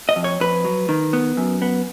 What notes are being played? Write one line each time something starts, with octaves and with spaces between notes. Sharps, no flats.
D#5
F2
C#5
F2 B4
F#3
D#3
B3
F#2
B3